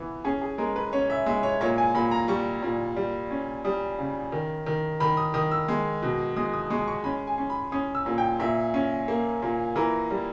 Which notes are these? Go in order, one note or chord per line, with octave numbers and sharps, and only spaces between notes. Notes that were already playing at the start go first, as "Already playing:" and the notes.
Already playing: E3 B3
C#4 G#4
G#4
G#3 A#4
B4
C#4 C#5
E5
G#3 E5
C#5
A#2 C#5
G#5
A#2 B5
A#5
G3 C#6
A#2
G3
C#4
G3 D#6
C#3
D#3
D#3
D#3 B5
D#6
D#3 D#6
E6
G#3
B2
G#3 D#6
D#6
G#3 C#6
C#6
C#4 B5
G#5
C#4
B5
C#4 D#6
E6
A#2
G5
A#2 E5
C#4
A#3
A#2
E3 A#4
G3